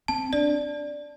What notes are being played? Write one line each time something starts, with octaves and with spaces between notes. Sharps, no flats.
C4 A5
D4 D5